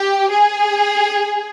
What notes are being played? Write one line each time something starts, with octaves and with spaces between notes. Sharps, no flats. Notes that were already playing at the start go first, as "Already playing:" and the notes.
Already playing: G4
G#4